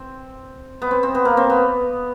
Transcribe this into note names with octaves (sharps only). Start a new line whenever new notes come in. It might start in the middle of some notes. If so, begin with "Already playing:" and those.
Already playing: C4
B3
C4
C4
B3
A#3
C4
B3